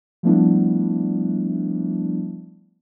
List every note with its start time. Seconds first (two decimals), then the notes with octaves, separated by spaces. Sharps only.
0.23 F3 G3 A3 B3 D4 E4